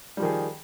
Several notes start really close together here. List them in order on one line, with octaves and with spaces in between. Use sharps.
G3 F3 D#3 G#4